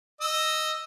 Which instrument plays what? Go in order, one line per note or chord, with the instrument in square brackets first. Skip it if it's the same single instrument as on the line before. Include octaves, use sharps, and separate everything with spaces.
[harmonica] D#5 E6